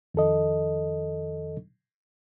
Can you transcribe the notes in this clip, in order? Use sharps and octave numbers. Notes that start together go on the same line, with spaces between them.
F2 D#3 A4 D#5